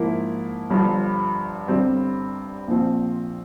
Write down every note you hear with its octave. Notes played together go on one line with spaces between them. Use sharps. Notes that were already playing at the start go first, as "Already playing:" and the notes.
Already playing: G#2 F3 A#3 E4
G1 G2 F3
G1 G2 G3 C4
A#1 A#2 F3 C4